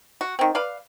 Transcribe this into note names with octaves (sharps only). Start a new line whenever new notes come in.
F#4
D#3 C4
B4 D5 F5